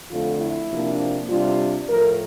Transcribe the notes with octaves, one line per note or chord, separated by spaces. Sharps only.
F2 D3 A3 F4
E4
C3 F3 A#3 D4
C3 G3 D4 F4
A2 F3 A3 A#4